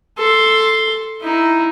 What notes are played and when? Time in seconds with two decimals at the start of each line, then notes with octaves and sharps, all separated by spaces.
0.17 A4 C6
1.21 D#4 E4